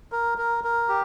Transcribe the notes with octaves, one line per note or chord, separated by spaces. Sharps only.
A#4
A#4
A#4
G4